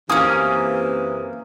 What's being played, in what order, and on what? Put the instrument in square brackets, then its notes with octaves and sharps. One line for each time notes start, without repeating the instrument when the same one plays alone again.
[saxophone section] F#2 C3 E3 [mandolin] A#3 C#4 [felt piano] D#6